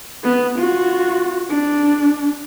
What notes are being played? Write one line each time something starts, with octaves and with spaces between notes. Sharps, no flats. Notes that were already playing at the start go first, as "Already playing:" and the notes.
B3
F4 F#4
D4